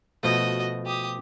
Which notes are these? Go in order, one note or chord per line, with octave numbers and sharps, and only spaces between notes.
B2 F3 A3 F#4 D#5
G4 D#6